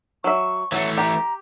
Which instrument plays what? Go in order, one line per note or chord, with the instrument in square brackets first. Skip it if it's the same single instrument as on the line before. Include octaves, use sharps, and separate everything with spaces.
[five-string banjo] F#3 E5 [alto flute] C#6
[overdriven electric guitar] E3 A3 [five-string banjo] F#3
[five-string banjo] G4 [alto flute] A#5